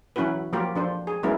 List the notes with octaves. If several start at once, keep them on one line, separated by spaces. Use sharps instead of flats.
E3 F#3 C#4 E4 F#4 B4
F3 F#3 A#3 F4 G4 A#4
F3 D4 C5
G#4
F#3 G#3 B3 C#4 E4 A#4